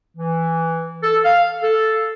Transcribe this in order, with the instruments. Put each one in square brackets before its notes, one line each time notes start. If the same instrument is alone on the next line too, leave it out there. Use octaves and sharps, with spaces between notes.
[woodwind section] E3
A4
F5
A4